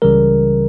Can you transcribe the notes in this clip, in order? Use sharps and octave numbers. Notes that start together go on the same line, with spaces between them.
C#2 C#3 E3 G3 A#4